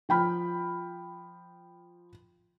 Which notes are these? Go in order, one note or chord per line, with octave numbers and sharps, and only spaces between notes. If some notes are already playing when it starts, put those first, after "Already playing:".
F3 G5 B5 F6